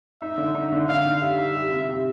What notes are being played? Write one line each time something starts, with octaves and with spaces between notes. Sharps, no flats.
D#4 E5
D3
D#4
D3
D#4 F5
D3
G3 E5
D#4
G3
C3
C3